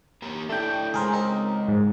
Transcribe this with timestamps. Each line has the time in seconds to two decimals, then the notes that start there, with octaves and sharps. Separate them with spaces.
0.22 A#3 G4 A#4
0.49 A3 D4 E4 G5
0.94 C#3 G#3 G#4 A#4 C5
1.12 C4 D#4 A#4
1.68 G#2